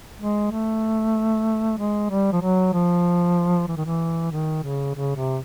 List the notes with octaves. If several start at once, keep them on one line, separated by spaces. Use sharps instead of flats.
G#3
A3
G#3
G3
F3
F#3
F3
E3
D#3
E3
D#3
C#3
C#3
C3